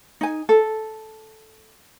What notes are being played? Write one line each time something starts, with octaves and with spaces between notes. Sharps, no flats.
D#4 G#5
A4